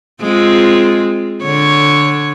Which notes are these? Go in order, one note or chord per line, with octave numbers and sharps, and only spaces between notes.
G#3 C4 F4
D3 C#5